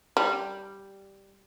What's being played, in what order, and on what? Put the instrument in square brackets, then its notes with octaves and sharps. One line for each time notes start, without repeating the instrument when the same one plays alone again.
[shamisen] G3